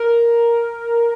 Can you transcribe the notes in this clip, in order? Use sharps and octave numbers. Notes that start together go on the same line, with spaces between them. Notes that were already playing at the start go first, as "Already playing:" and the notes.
Already playing: A#4